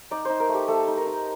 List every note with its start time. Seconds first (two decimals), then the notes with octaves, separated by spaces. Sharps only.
0.11 D#4 D5
0.25 D#4 C5
0.40 A#4
0.49 A3
0.54 G4
0.68 A3 A4
0.87 D#4
0.97 A#4
1.06 D#4